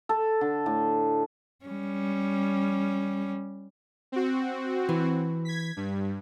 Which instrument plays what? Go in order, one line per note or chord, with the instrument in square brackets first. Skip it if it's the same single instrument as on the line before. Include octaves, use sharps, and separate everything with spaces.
[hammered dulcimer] A4
D3
A2
[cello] G3 C#4
[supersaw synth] C4 F#4
[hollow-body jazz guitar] E3
[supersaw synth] G#6 B6
G2